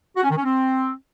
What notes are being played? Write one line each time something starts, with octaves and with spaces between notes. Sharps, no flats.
F#4
C#4
D#3
C#4
C4